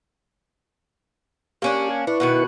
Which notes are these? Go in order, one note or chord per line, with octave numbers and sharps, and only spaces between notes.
A#3 C#4 D4 G4
G#5
D4 E4 B4 C#6
B2 D#3 F#4